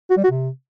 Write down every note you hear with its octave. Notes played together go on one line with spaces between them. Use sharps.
F#4
G3
F#4
C3